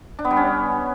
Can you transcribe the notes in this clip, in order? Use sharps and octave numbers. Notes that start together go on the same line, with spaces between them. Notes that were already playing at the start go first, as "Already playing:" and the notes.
D4
B3
G3
C#4